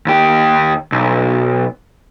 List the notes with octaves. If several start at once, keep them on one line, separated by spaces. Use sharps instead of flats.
D#2 G4
B1